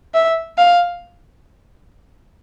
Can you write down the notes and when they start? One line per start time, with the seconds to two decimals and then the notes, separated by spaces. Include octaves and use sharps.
0.14 E5
0.58 F5